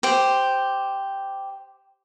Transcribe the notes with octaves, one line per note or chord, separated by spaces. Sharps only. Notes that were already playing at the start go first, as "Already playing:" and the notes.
G4 C5